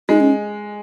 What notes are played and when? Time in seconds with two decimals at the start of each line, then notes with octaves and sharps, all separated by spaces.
0.09 G#3 D#4
0.20 C#4